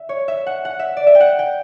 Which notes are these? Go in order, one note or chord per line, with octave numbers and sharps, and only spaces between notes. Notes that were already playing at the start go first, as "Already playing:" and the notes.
Already playing: E5
C#5
E5
F#5
F#5
E5
D5
E5
G5
F#5
G5